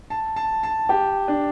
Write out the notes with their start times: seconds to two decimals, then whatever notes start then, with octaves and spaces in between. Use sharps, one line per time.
0.10 A5
0.36 A5
0.63 A5
0.89 G4
1.28 D4